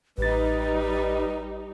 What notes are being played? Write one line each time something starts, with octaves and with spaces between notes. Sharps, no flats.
A1 G3 D#4 B4 A6